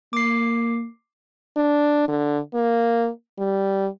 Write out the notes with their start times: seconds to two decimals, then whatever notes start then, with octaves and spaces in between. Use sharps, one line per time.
0.13 A#3 D6 C7
1.57 D4
2.08 D3
2.54 A#3
3.39 G3